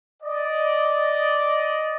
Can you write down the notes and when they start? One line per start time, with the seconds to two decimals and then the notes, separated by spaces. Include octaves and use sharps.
0.23 D5 D#5